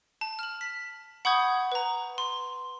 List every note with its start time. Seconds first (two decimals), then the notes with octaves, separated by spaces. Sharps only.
0.21 A5
0.39 F6 F#7
0.61 B6
1.25 F#5 B5 C#6 D#6 G6 G#6
1.72 B4 A#5
2.18 C6